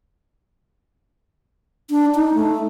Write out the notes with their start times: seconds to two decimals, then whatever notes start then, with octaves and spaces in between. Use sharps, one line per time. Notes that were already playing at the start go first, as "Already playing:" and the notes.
1.90 D4
2.15 D#4
2.34 A3